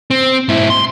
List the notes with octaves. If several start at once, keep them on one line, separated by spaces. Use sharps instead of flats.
C4
G#2 E4
C6